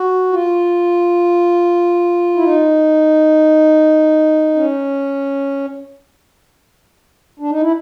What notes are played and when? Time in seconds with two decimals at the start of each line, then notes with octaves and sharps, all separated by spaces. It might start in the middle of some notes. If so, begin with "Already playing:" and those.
Already playing: F#4
0.33 F4
2.36 E4
2.44 D#4
4.55 C#4
7.40 D4
7.51 D#4
7.61 E4